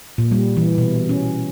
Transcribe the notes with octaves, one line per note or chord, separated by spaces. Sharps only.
A#2
G3
E3
B2
C#4